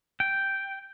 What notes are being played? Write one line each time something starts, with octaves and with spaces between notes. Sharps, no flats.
G5